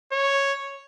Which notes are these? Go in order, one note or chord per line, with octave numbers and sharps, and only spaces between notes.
C#5